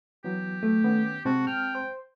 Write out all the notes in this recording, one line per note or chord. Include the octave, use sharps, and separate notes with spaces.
E3 F#3 B3 G4
A3
D#3 B3 C#4
C3 G#3 C4 F#4 A5
G5 F6
C5